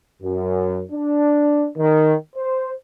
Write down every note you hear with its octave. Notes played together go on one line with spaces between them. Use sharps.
F#2
D4
D#3
C5